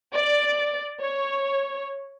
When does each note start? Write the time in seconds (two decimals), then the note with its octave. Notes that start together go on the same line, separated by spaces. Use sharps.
0.13 D5
1.00 C#5